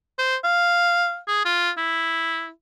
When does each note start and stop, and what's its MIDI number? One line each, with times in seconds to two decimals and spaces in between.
0.19 0.36 72
0.44 1.18 77
1.28 1.41 68
1.45 1.71 65
1.78 2.50 64